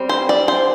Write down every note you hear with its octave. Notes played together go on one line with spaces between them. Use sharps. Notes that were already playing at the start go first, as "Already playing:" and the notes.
Already playing: G3 C4
C5
D5
C5